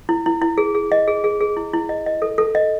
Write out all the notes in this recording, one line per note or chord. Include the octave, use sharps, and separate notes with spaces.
E4
E4
E4
G#4
G#4
D#5
G#4
G#4
G#4
E4
E4
D#5
D#5
A4
A4
D#5